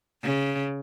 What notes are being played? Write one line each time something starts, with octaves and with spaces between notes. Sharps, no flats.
C#3